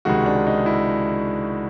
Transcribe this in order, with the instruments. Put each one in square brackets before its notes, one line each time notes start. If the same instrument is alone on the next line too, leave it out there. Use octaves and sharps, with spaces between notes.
[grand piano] C#2 C3 D#3 G#3 F#4
D4
D#4
E4